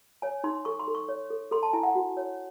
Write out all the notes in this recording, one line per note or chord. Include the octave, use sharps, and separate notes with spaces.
C#5 G#5
D#4 C6
A4 C#6
C6
A4
C#6
C#5
A4
A4 C6
A5
E4 G#5
F#5
F#4
C#5